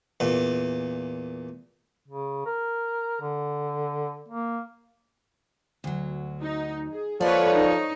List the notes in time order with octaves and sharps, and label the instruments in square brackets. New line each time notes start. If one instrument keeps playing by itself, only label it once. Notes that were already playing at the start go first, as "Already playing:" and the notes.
[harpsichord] E2 A#2
[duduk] C#3
A#4
D3
A#3
[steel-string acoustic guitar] D2 F#3
[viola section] D#4
G#4
[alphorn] F3 [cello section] A#3 B4 [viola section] A4 C#5 [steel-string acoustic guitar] D5 F#5
[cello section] D#4